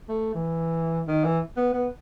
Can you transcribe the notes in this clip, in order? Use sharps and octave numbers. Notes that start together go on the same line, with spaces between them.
A3
E3
D#3
E3
B3
B3